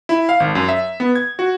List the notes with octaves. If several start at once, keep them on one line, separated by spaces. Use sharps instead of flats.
E4
F5
G#1
F#2
E5
B3
G#6
F#4